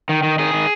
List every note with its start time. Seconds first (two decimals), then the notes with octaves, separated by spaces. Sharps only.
0.09 D#3
0.23 D#3
0.39 D#3 G#4
0.53 D#3